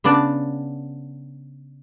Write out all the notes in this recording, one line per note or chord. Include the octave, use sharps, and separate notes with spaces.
C#3 B3 D4 D5 A5